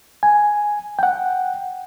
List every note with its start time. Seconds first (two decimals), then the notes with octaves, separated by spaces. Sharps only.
0.23 G#5
0.99 F#5 G5